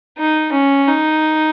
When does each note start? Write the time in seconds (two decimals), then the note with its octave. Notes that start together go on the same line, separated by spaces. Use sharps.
0.18 D#4
0.52 C#4
0.88 D#4